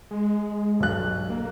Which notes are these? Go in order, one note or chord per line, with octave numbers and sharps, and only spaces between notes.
G#3
B1 G2 F#6
A#3